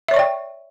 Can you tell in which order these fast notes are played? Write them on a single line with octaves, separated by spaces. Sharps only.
E5 C#5 C#6 D5 G5